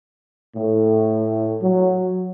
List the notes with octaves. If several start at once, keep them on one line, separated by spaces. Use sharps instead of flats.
A2
F#3